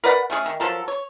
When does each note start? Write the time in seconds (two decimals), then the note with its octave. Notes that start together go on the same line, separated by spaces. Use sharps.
0.04 A#4 B4 D5 F#5
0.30 A3 C#4 G#4
0.46 D#3
0.60 F3 F#3 A4 A#4
0.88 C#5